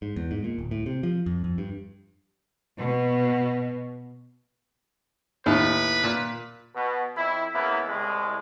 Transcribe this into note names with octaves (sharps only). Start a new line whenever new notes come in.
G#2
E2
G#2
A#2
D1
A2
C3
F3
F2
F2
G2
B2
D#2 A2 B4
A#2
B2
F2 E4
C#3 A#3 B3 E4
C2 A2 G#3